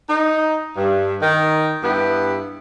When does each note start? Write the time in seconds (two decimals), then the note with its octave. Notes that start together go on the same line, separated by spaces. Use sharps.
0.09 D#4
0.77 G2
1.22 D#3
1.83 G2 B3 E4 G4